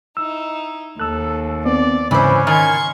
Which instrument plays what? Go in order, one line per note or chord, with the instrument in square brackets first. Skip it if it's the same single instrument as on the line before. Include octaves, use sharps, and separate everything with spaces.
[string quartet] D#4 E4 [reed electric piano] E6
[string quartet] D#2 [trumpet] A4 [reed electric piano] E6 F#6
[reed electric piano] B3 C4 [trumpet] D5
[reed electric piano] G#2 C#3 D6 [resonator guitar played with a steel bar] E3 C5 [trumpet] C#4
[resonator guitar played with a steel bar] D#3 [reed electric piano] G#5 F6 [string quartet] C6 C#6 G#6